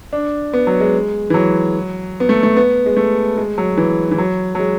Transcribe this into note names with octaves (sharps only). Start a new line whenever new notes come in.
D4
B3
F#3
G#3
E3
F#3
B3
A3
A3
B3
G#3
A3
G#3
F#3
E3
E3
F#3
F#3
G#3